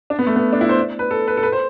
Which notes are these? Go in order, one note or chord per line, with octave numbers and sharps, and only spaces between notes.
D4
B3
A3
B3
D4
E4
C5
D5
B4
A4
B4
A4
B4
C5